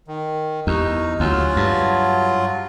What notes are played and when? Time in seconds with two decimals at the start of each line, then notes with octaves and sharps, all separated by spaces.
0.08 D#3
0.67 E2 D#4 G4 C#6
1.20 D2 F#3 F4 F5 F#5 G#5
1.56 G2 F#5 A5 B5